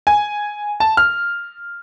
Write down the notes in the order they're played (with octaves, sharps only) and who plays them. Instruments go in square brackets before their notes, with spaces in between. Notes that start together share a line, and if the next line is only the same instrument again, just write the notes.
[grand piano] G#5
A5
F6